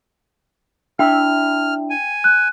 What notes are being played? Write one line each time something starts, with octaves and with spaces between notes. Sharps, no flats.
D4 E4 E5 G5 F6
G#5
F#6